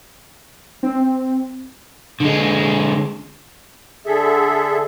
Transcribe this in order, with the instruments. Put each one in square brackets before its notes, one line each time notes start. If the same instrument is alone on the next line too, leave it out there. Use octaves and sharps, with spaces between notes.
[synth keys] C4
[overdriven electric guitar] D3 G#3
[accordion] D3 G#4 A4 E5